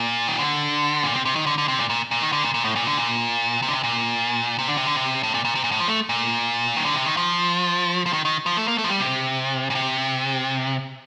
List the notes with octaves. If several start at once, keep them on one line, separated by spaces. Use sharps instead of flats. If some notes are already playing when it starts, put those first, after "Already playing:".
Already playing: A#2
D#3
D3
A#2
C3
C3
D#3
D3
D3
C3
A#2
A#2
A#2
D#3
D3
A#2
A#2
A2
A#2
D3
A#2
C3
D3
C3
A#2
C3
D3
C3
D3
C3
A2
A#2
A#2
C3
A#2
A2
F3
A3
A#2
D#3
D3
C3
D#3
F3
F3
D#3
D#3
F3
A3
A#3
A3
F3
G3
C3
A#2
C3